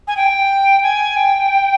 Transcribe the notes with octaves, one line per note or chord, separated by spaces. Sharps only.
G#5
G5
G#5
G5